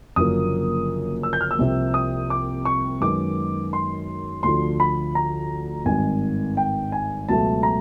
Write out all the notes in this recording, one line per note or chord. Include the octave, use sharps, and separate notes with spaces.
F#1 F#2 D3 F3 A#3 D#6
E6
G6
F6
E6
C2 C3 F3 A#3
D#6
D6
C#6
F#2 D#3 G#3 B3 D6
C6
D2 D3 F3 C6
B5
A#5
G#1 G2 D#3 G#3 G#5
G5
G#5
C#2 B2 F#3 A3 A5
A#5